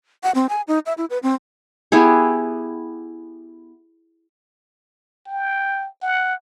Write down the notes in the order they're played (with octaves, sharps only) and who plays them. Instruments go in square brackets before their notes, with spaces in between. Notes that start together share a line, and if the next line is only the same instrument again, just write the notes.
[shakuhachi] F#5
C4
G#5
D#4
E5
E4
B4
C4
[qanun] B3 E4 G4 G#4
[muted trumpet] G5
F#5